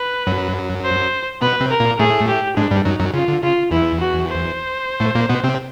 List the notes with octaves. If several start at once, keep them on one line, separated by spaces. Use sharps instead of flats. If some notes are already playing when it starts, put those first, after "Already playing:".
Already playing: B4
F#2 F#3
C5
B2 B3 B4
C3 C4
A#4
A#2 A#3
A2 A3 G#4
G4
G#2 G#3 D4
G2 G3
F#2 F#3 D#4
F#2 F#3
C#3 F4
D3
C#3 F4
E2 E3 E4
F#4
C5
A2 A3
A#2 A#3
B2 B3
C3 C4